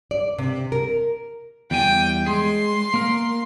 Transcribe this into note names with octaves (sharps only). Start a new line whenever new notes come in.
D5
C3
A#4
E2 G3 G5 G#5
G#3 G#4 C6
A#3 A#4